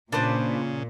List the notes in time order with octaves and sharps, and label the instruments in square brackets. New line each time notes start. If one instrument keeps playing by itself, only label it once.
[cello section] A#2 [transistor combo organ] C#3 [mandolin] D4 B4 C5